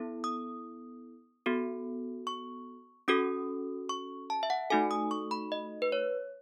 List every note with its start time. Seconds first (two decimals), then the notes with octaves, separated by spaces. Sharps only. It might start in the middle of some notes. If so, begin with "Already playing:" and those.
Already playing: B3 E4 A4
0.24 D#6
1.46 B3 F#4 A4
2.27 C#6
3.08 C#4 F#4 A4 D#6
3.89 C#6
4.30 A5
4.43 E5
4.50 F#5
4.70 A3 D#4 F#4 A4 G#5
4.91 D#6
5.11 C#6
5.31 B5
5.52 D#5
5.82 B4
5.92 C#5